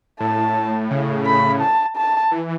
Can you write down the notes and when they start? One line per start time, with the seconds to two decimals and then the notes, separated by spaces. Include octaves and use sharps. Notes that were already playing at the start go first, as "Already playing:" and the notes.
0.20 A2 A5
0.91 C#3
1.26 B5
1.61 A5
1.97 A5
2.31 E3